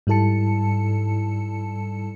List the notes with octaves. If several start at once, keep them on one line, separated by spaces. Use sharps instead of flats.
G#2 G3 E4 A4 A5 C#7